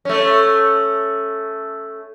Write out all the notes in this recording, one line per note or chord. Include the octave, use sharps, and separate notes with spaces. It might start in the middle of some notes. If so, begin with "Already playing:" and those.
A3 C#4